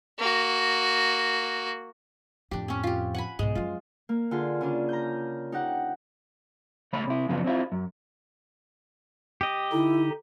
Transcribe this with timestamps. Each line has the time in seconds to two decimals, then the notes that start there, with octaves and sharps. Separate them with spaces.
0.19 A#3 F#4
2.51 F2 A2 D4 G4
2.68 C4 C#4
2.83 F4 G4
3.15 F#5 G#5 B5
3.39 B1 G#2 G#3
3.55 F#2 F3 F4
4.09 A#3
4.31 D3 F4 G#4
4.61 C#3 C#4 D4 F4
4.89 A#5 G6
5.52 D#4 G4 F#5
6.93 C#2 A3 C#5 B5
7.07 C3 E4
7.29 F#2 C#3 F3 B3
7.44 C4 C#4 E4 F4
7.72 F#2
9.41 G4 D#5
9.72 D3 D#4 E4